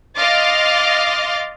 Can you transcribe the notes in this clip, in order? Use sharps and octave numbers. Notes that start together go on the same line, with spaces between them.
D#5 F5 C6 D6 F6 A6